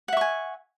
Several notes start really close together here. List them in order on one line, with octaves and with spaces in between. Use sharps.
F#5 E5 C#6 G#5